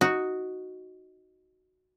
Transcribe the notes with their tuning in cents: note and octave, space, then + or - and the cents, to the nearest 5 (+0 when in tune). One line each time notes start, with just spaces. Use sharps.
D#4 +0 F#4 +0